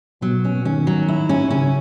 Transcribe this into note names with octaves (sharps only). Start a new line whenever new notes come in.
B2 F#3
C#4
D#3 C#4
F#3
E4
C#4
C#3 C#4